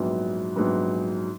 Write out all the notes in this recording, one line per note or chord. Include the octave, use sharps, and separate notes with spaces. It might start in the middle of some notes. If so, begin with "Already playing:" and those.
Already playing: A#1 G#2 F#3 B3
A#1 G#2 F#3 B3